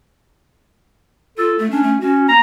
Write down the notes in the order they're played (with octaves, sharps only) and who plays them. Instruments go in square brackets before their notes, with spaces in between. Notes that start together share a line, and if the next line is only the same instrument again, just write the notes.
[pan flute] F4 [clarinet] A4
[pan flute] A3
[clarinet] C#4 [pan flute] D4
[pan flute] A3
[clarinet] C#4 [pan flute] F#4
[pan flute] A#3 [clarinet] A#5